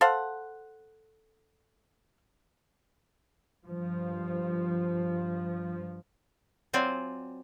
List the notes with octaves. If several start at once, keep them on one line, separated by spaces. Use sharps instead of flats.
A4 C5 F5 F#5
G2 F3
F#3 C4 F4 C5 D5 G#5